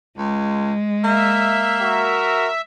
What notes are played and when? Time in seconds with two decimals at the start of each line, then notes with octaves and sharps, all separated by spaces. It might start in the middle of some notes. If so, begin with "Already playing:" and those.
0.18 C#2 G#3
1.04 A#3 E5
1.81 F#4 A#4